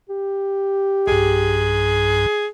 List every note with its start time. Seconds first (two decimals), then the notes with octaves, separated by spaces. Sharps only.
0.09 G4
1.07 B1 G2 G#4